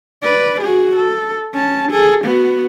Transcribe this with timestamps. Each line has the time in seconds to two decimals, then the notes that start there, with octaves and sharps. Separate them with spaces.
0.23 B4 D5
0.61 F#4 G#4
0.96 A4
1.54 C#4 A5
1.92 G#4 A4
2.25 B3 F#4